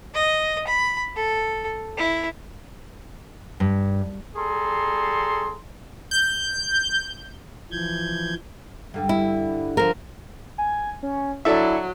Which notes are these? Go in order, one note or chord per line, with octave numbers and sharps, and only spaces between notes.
D#5
B5
A4
E4
G2
G3 G#4 A4 A#5 C6
G6
E3 F3 G6 G#6
G2 D3
E4
F3 A#4
G#5
C#4
F#3 D4 E4 A4 E5